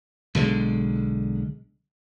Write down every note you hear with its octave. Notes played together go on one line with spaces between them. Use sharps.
B1 D3 G3 G#3